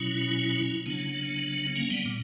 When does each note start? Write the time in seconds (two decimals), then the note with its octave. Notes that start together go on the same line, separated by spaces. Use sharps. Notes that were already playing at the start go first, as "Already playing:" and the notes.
Already playing: B2 F#3 C#4 E4
0.86 C#3 F#3 B3 D4
1.75 A#3 C#4
1.90 G3 B3
2.05 A#2